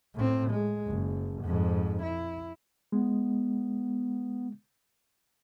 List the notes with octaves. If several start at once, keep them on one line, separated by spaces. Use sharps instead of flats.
A2 C4
G#3
F#1
F2 G#2
E4
G#3 B3